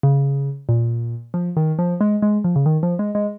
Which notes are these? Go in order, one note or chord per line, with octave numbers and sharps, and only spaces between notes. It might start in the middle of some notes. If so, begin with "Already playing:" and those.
C#3
A#2
F3
D#3
F3
G#3
G#3
F3
C#3
D#3
F3
G#3
G#3